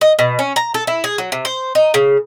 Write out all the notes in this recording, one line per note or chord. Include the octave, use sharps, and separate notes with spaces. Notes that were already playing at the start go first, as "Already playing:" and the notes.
D#5
B2
C#4
A#5
A4
E4
G#4
F#3
C3
C5
D#4
C#3